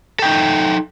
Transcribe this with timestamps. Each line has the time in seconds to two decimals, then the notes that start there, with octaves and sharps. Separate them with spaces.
0.19 A4
0.22 G5
0.25 D#4